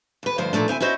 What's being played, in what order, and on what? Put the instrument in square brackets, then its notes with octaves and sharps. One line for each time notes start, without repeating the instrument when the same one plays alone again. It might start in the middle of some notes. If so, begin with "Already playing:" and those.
[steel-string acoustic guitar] D#2 B4
D2 G2 F3 F4 C5
A#2 F3 A3 D4
D2 C4 E4 G#5
C#4 E4 F#4 C5 D#5